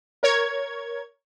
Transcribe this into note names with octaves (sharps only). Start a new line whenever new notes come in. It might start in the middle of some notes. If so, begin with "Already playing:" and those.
A#4 C#5 G#6